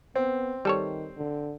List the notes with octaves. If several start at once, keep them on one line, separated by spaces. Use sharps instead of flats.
B3 C4
D#3 G3 A4 C#5
D3